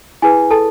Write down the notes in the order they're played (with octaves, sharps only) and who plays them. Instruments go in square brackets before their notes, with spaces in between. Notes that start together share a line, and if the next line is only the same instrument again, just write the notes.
[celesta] E4 G#4 B4 G#5
A4 A5